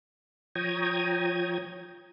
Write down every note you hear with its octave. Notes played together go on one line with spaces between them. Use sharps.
F3 C#5 G5 A#5 D#6 G#6